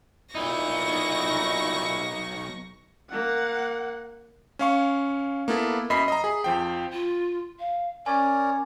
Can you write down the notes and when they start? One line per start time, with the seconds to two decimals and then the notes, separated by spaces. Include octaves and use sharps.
0.35 B1 A#2 D#4 E4 C#6 A#6
3.10 A#3 F#5
4.59 C#4 F5 C#6
5.48 A#3 B3 E4 A4
5.90 F#2 D#5 E5 B5 B6 C7
6.08 D#5 A#5
6.24 G#4
6.44 F2 F3 G5
6.92 F4
7.59 F5
8.06 C#4 A#4 C#5 D5 G#5